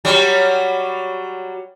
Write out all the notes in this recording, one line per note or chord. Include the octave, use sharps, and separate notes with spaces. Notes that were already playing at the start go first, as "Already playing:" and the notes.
F#3 G3